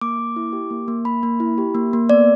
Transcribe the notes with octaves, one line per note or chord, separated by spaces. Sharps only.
A#3 D6
A#3
E4
G4
A#3
A#3
A#3 B5
A#3
E4
G4
A#3
A#3
B3 D5